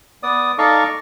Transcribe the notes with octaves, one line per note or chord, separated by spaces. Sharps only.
B3 D5 D#6
D#4 A4 D5 D#5 F5 C#6